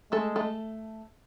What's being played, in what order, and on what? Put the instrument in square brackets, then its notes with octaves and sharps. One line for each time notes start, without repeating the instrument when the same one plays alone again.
[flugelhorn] G#3 [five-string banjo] A3 A4
[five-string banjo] A3 A4